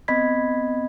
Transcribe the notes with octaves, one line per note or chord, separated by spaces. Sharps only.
B3 C4 D#5 B5 G#6 B6